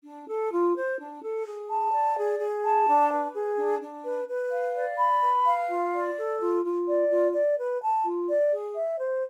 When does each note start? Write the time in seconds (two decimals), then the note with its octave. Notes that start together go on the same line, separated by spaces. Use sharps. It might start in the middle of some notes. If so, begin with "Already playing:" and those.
0.04 D4
0.28 A4
0.52 F4
0.76 C5
1.00 D4
1.22 A4
1.46 G#4
1.69 A5
1.93 D5
2.17 G#4
2.40 G#4
2.64 A5
2.88 D4
3.11 B4
3.35 G#4
3.57 D4
3.81 D4
4.05 B4
4.28 B4
4.52 F5
4.75 D5
4.99 B5
5.23 B4
5.46 F5
5.69 F4
5.94 D5
6.17 A4
6.40 F4
6.64 F4
6.87 D5
7.10 F4
7.34 D5
7.57 B4
7.82 A5
8.05 F4
8.29 D5
8.52 G#4
8.75 E5
9.00 C5